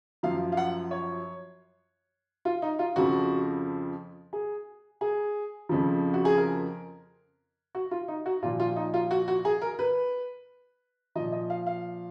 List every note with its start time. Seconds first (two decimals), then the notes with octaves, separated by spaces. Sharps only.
0.23 F#2 F3 F5
0.52 F5
0.57 F#5
0.91 C#5
2.45 F4
2.62 D#4
2.79 F4
2.96 F2 C#3 F3 F#4
4.33 G#4
5.01 G#4
5.69 F2 C#3 F3
6.14 F#4
6.25 G#4
6.38 A#4
7.75 F#4
7.91 F4
8.08 D#4
8.26 F#4
8.42 A#2 F4
8.45 F3
8.60 F4
8.76 D#4
8.94 F4
9.11 F#4
9.28 F#4
9.45 G#4
9.62 A#4
9.79 B4
11.15 F3 D#5
11.19 A#2
11.32 D#5
11.50 F5
11.67 F5